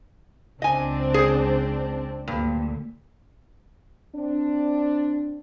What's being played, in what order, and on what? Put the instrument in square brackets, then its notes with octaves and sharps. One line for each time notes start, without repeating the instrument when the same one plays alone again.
[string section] C#2 C4 D4 [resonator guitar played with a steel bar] D#5 G#5
[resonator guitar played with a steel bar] G#4 C5
[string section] D2 A#2 D3 [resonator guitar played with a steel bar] G2
[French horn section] C4 D4